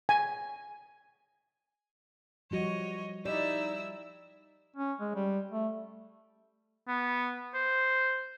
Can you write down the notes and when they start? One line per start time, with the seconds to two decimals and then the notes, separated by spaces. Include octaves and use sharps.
0.09 G#5
2.51 F3 G3 F#4 C#5 D#5
3.25 G3 D#4 E4 D5 D#5 E6
4.76 C#4
5.01 G#3
5.15 G3
5.51 A3
6.88 B3
7.54 C5